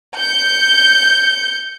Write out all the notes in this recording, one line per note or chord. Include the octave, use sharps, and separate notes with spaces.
G6 C#7